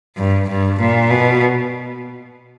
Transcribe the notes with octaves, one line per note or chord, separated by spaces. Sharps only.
G2
G2
A#2
B2